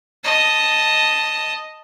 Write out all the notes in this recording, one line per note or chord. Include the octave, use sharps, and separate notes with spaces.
D#5 A5